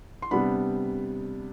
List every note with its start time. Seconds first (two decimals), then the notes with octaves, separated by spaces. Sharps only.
0.22 C6
0.31 C3 G3 B3 D4 B5